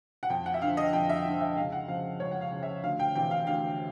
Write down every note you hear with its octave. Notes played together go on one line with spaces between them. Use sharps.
F#5
F2 G5
F#5
E5
D3 F3 F5
D#5
F2 G5
E5
D3 F3
E5
C#2 F5
F#5
C#3 F3 F5
C#2 C#5
F#5
F5
C#3 F3
E5
D2 F5
G5
C3 E3 G5
F5
D2 F5